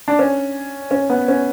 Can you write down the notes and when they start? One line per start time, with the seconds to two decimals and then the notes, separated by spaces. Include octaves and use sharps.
0.08 D4
0.19 C#4
0.91 C#4
1.10 B3
1.28 C#4